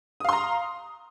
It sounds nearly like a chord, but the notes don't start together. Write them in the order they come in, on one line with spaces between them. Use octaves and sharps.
D#6 F5 C6 A#5